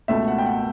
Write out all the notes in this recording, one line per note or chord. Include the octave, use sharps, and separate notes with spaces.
C#2 B2 A3 E5
F#5
G5
F#5